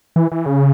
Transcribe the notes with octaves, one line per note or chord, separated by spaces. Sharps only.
E3
E3
C#3